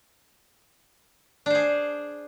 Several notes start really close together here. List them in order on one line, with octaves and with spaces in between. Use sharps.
D4 C5 G#4